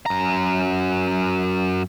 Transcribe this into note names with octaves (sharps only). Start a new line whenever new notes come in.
F#2 A#5